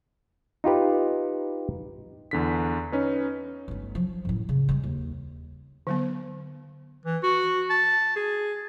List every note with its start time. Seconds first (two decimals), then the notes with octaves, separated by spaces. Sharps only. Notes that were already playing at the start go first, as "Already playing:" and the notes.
0.64 D#4 F4 G4 B4
2.31 E2 D3 B6
2.92 C#4 D#4 B4
3.68 G1 A3
3.95 F3 F#3
4.25 F#2 A2
4.49 C#3
4.69 G3 G#3
4.84 D#2
5.87 D3 F#3 B3
7.05 E3
7.23 F#4
7.70 A5
8.16 G#4